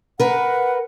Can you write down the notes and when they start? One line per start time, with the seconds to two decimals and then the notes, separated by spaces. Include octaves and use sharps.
0.20 A#4 B4 F#5